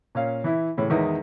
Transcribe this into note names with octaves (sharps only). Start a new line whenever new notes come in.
A#2 C#4 F5
E3 E4
A2 C#3 E3 C#4
E2 D#3 G#3 D#4 E4 B4